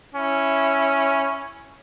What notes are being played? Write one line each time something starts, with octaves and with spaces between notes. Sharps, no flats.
C#4 E4